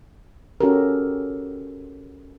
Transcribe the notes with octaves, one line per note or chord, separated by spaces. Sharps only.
C#4 F#4 G4 A4 A#4